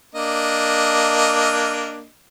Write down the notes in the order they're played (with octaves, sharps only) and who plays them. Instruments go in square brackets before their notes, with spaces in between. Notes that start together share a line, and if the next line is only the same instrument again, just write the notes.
[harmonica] A#3 D4 D#5